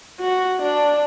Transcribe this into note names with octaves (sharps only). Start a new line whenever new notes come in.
F#4
D4